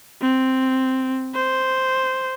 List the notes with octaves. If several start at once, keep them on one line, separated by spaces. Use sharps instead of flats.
C4
C5